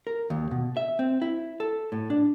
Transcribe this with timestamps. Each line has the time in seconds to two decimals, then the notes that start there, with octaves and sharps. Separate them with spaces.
0.07 A#4
0.30 D#2
0.51 B2
0.77 E5
0.99 C4
1.22 E4
1.60 A4
1.92 A2
2.10 D4